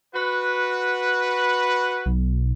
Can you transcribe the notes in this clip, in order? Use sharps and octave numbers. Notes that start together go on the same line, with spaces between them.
F#4 B4
B1